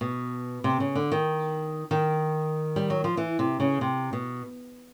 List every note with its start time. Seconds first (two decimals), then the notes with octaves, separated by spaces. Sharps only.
0.01 B2
0.64 C3
0.80 C#3
0.95 D3
1.12 D#3
1.91 D#3
2.76 G3
2.90 F#3
3.04 F3
3.17 E3
3.39 C3
3.60 C#3
3.81 C3
4.13 B2